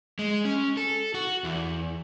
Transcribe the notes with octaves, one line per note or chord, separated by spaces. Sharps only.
G#3
C#4
A4
F#4
E2